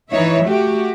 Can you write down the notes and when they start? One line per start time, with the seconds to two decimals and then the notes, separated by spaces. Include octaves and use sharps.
0.10 E3 D#4 C#5 E5
0.46 A3 F#4 G4